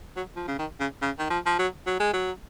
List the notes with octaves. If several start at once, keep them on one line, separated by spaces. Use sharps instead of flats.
F#3
F3
C#3
D#3
C#3
C#3
D#3
F3
F3
F#3
F#3
G#3
F#3